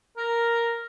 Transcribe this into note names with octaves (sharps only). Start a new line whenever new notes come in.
A#4